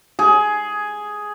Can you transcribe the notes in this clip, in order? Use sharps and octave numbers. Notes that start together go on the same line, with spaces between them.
G#4